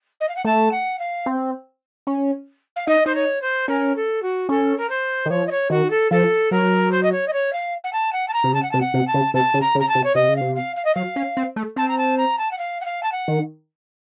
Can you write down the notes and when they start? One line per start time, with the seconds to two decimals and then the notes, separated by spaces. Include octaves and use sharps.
0.20 D#5
0.28 F5
0.36 F#5
0.45 A3 A5
0.71 F#5
0.99 F5
1.26 C4
2.07 C#4
2.76 F5
2.87 D#4 D#5
3.06 D#4 C5
3.15 C#5
3.41 C5
3.68 C#4 A#4
3.96 A4
4.22 F#4
4.49 C#4 A4
4.78 A#4
4.89 C5
5.26 D#3
5.30 F3 C#5
5.47 D#5
5.51 C#5
5.70 D#3 F#4
5.90 A4
6.11 F3 A4
6.51 F#3 A#4
6.91 C5
7.03 D#5
7.12 C#5
7.27 D#5
7.33 C#5
7.53 F5
7.84 F#5
7.93 A5
8.12 F#5
8.28 A5
8.33 A#5
8.44 C3
8.53 C#3 A5
8.63 F#5
8.71 C3 A5
8.80 F#5
8.94 C3
9.07 A5
9.14 C#3
9.34 C3 A5
9.54 C#3
9.61 A#5
9.75 C#3
9.80 A#5
9.88 A5
9.95 C3
10.04 C#5
10.15 C3 D#5
10.29 C#3
10.36 F5
10.41 C3
10.55 F5
10.76 F5
10.85 D#5
10.95 F#3 F5
11.16 C#4
11.37 C4
11.56 A3
11.76 C4 A5
11.88 A#5
11.98 A5
12.17 A#5
12.38 A5
12.51 F#5
12.58 F5
12.81 F#5
12.85 F5
13.03 A5
13.12 F#5
13.28 D#3